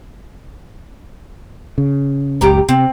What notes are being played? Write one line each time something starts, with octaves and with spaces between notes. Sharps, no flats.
C#3
F#1 C#2 G3 G4 A#5
C3 C4